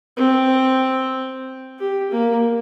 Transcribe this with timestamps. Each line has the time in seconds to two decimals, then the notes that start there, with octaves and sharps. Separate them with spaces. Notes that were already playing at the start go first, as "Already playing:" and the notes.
0.17 C4
1.79 G4
2.11 A#3